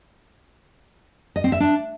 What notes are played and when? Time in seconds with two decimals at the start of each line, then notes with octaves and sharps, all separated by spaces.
1.36 D#5
1.44 C4
1.52 E5
1.60 D4